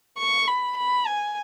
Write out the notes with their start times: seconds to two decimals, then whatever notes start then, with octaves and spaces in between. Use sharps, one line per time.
0.19 C#6
0.48 B5
0.78 B5
1.07 G#5